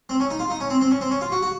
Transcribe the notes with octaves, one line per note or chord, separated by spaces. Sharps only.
C4
C#4
D#4
F4
D#4
C#4
C4
C4
C#4
C4
C#4
F4
F#4
F#4